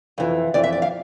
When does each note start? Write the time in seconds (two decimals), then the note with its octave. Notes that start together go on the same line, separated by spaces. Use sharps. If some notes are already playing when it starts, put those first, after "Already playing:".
0.18 F2 E3
0.54 F2 E3 D5
0.64 E5
0.73 D5
0.82 F5